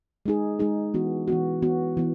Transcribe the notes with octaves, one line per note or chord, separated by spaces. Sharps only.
G#3 D#4 G#4
G#3 D#4 G#4
E3 B3 F#4
E3 B3 F#4
E3 B3 F#4
E3 B3